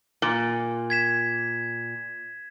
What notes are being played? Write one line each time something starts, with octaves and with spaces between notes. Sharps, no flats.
A#2
G#6 B6 E7